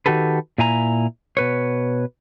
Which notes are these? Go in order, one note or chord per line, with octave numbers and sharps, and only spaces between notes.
D#3 F#4 G4 A4 B4
A#2 E4 G#5 A#5
B2 B4 C#5